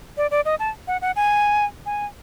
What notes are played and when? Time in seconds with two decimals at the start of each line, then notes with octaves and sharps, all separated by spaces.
0.17 D5
0.31 D5
0.45 D#5
0.60 A5
0.87 F#5
1.02 F#5
1.16 G#5
1.86 G#5